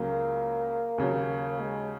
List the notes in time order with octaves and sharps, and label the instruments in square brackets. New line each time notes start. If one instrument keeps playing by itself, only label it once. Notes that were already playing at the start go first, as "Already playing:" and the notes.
Already playing: [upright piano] C#2 C#3 F#3 [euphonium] A#3
[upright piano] D#2 C#3 F#3
[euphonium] G#3